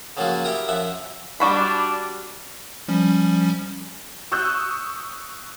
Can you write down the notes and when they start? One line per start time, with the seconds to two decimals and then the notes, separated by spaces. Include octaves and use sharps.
0.17 C#3 F3 F#3 A#3 F4 F#4
0.44 E4 G4 A#4 A#5 D#6
0.68 F#2 F3 E5 F#5
1.40 G3 D4 F#4 B5
2.88 F3 G3 C#4
4.32 C#6 D#6 E6 F#6 G6